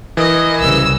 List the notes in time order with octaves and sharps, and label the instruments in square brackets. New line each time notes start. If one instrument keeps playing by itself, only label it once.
[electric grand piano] E3 A#4 [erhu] D#5
[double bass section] C2 C#3 [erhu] E6